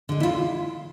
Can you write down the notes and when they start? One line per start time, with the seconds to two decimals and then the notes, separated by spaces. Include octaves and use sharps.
0.09 D3 G#3
0.20 E4
0.23 D2 F4